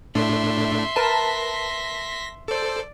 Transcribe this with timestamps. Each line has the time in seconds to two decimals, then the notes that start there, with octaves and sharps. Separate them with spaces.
0.15 A2 A3 D4 E5 C6
0.96 A#4 B4 A5 A#6 B6
2.48 A4 C5 D5